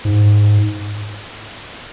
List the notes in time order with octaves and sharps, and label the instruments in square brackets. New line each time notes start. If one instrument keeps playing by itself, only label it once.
[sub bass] G#2